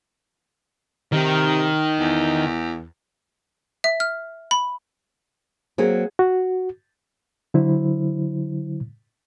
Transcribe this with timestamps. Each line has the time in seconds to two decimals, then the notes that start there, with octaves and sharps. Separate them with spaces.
1.13 C3 D#3
2.00 E2
3.84 E5
4.00 F6
4.51 B5
5.78 F#3 A#3 C4 G#4
6.19 F#4
7.54 D3 F#3 E4 C5